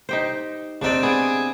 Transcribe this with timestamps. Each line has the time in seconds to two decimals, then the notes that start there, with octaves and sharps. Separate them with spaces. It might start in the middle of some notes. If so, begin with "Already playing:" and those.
0.09 D#4 G4 C5
0.82 C3 C4 D4 D#4 D5
1.03 B3 G#4 D5